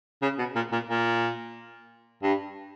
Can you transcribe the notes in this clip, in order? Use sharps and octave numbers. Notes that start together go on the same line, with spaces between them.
C#3
B2
A#2
A#2
A#2
G2